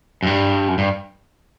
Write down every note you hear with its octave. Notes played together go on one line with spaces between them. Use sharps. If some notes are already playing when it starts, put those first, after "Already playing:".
F#2
G2
F#2
G2